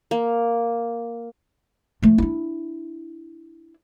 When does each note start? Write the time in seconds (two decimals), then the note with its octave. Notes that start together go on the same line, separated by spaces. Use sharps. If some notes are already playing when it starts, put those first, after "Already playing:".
0.11 A#3
2.02 F3 A3
2.18 D4 E4